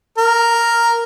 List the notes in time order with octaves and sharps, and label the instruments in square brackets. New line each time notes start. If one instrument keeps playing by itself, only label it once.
[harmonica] A#4